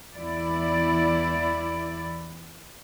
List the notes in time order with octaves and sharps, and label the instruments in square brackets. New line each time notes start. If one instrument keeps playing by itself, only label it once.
[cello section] E2 E4 D5